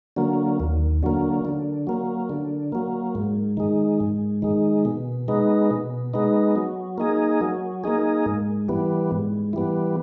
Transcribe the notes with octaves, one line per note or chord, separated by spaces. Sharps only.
D3 F#3 A#3
D#2
D3 F#3 A#3
D3
F#3 A#3
D3
F#3 A#3
G#2
D#3 G#3
G#2
D#3 G#3
B2
G#3 B3 D#4
B2
G#3 B3 D#4
F#3
A#3 D#4 G#4
F#3
A#3 D#4 G#4
G#2
E3 G3 B3
G#2
E3 G3 B3